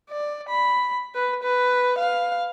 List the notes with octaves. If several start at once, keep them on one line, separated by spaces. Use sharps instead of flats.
D5
B5
B4
B4
F5